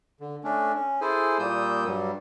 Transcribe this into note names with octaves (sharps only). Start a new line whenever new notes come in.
D3
A3 C#4 D4
C#4
E4 G#4 A4 C5 G#5
A#2 G3 A#3 D#6 E6 G6
G2 F#3 G3